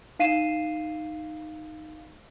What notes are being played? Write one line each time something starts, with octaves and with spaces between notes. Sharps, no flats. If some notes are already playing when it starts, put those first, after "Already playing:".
D#4 F5 C7 D#7 E7